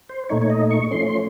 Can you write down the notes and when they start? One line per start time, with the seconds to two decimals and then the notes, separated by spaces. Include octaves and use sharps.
0.09 C5
0.29 A#2 A3 D#4 C#5
0.42 C#5
0.50 D#5
0.70 C#6
0.91 F3 A3 C#4 C6
1.07 C6